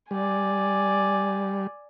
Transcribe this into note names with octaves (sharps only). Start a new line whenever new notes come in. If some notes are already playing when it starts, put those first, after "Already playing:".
G3 D5 G#5